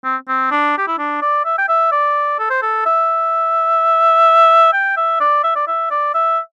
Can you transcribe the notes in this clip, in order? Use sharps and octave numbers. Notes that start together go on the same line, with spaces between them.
C4
C4
D4
G4
E4
D4
D5
E5
G5
E5
D5
A4
C5
A4
E5
G5
E5
D5
E5
D5
E5
D5
E5